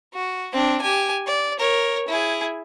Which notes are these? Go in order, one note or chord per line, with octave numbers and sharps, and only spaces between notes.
F#4
C4 D4
G4 G#5
D5
A#4 C#5
E4 G#4